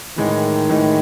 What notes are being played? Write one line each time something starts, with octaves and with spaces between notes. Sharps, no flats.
A2 D#3 E3 G#3 D#4
A2 E3 G#3 D#4